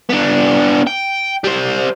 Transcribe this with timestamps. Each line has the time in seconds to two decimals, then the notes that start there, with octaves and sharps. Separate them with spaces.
0.09 B3 D4
0.87 G5
1.44 G3 C5